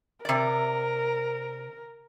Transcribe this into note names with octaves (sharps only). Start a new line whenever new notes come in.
C3 A#4 D5